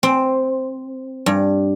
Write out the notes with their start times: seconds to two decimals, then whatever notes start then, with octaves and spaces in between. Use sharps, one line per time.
0.03 C4
1.26 G2